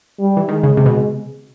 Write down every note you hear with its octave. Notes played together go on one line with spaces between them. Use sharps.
G3
E3
D#3 G#3
C#3
C3
B2